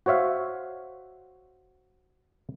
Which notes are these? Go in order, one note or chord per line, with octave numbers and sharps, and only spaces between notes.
F#4 C5 C#5 E5 F5